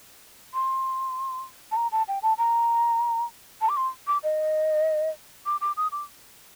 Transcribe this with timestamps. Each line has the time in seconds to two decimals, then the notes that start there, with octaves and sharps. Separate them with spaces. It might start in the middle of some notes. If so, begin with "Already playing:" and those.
0.54 C6
1.71 A5
1.76 A#5
1.92 A5
2.08 G5
2.23 A5
2.38 A#5
3.61 A5
3.69 D6
3.77 C6
4.07 D6
4.23 D#5
5.46 D6
5.61 D6
5.77 D#6
5.92 D6